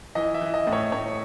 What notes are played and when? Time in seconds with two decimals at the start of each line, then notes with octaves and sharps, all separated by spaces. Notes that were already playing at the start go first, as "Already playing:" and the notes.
0.15 E3 D#5
0.34 E5
0.41 E3
0.54 D#5
0.67 A2
0.73 C#5
0.92 A2 C#5